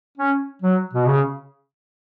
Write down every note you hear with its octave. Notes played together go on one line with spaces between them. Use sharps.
C#4
F#3
B2
C#3